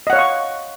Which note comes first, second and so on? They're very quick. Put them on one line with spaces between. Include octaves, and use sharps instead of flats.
D#5 F#5 C#5 F5 C#6